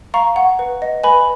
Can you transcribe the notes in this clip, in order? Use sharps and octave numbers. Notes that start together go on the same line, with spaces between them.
F5 A#5 C#6
F#5
B4
D#5
B4 G#5 B5